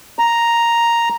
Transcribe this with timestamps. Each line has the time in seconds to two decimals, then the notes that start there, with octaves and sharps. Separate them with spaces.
0.19 A#5